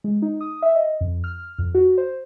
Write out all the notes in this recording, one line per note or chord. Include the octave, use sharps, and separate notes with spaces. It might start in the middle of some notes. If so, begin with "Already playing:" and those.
G#3
D#4
D#6
E5
D#5
F2
F6
F2
F#4
C5